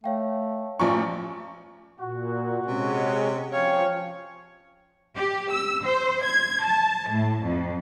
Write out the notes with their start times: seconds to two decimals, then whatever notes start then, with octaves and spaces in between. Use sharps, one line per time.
0.04 A3 C#5 F5 G5
0.79 A1 F3 D5 G#5 A#5 C#6
2.00 A#2 F#4
2.66 C3 G#3 C#4
3.53 F3 C#4 C#5 F5 G5
5.16 G4
5.52 E6
5.83 C5
6.24 G#6
6.64 A5
7.11 A2
7.44 F2